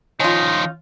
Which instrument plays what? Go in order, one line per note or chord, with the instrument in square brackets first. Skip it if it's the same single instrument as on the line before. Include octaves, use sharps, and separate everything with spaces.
[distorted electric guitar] D#3 F3 [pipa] C#4 F4 [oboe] D#4